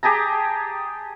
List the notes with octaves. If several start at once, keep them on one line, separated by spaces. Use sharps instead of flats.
G4 G#4 A5 A#5